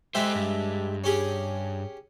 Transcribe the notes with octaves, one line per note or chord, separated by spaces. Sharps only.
G#3 G4 A4 C5 E5
G2
C#4 G4 G#4